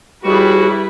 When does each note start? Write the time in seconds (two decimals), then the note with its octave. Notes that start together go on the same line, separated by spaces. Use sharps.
0.25 D#2 G3 E4 F#4 G#4 B4